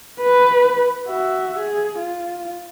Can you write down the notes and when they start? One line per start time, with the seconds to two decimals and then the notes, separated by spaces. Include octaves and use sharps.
0.21 B4
1.08 F#4 E5
1.59 G#4
1.99 F4